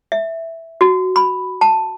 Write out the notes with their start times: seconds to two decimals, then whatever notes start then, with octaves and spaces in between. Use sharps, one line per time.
0.12 E5
0.81 F#4
1.16 B5
1.61 A5